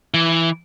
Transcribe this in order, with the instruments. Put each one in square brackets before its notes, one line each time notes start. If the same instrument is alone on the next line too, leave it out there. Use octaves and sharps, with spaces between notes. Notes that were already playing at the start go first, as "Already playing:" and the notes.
[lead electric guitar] E3